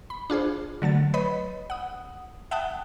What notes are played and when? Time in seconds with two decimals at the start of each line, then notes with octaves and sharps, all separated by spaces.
0.10 B5
0.30 D4 F4 G#4 C5
0.82 D3 F#3 A3 A6
1.14 B4 C#5 D#5 B5
1.70 F#5 D#6
2.51 E5 F#5 G5 A5 D#6 F#6